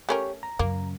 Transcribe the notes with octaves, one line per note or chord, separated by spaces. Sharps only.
A3 C#4 G4 A#4 C#5
A#5
F#2 C#3 A#3